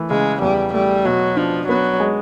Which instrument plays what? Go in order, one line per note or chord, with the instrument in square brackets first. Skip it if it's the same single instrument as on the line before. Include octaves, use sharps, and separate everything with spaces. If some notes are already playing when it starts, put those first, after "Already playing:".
Already playing: [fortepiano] E3 A3
[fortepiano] C#3 [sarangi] G#3
[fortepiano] E2 [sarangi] G3
[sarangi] G3 [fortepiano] A3
[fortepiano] B2 [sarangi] F#3
[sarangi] F3 [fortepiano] D4
[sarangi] F#3 [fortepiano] B3
[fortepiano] G#3